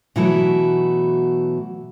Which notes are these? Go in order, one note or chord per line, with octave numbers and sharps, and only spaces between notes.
B2 E3 F#3 A3 E4 F#4